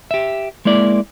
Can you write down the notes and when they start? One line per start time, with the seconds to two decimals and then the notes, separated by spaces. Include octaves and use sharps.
0.11 G4 E5
0.65 G#3 A#3 E4 D5